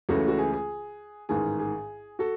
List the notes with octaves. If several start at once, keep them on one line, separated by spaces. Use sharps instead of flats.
C#2 C#3 E3 A3 F#4 A4
F#4
G#4
G#4
A1 G#2 D#3 G#4
G#4
F#4 A4